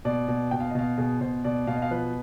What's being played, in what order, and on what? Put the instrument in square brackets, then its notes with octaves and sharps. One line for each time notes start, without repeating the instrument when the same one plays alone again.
[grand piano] B2 D5
B2
B2 G5
F5
D#5
B2 F5
B2 G#4
B2 C5
B2 D5
B2 F5
D#5
F5
F3 B4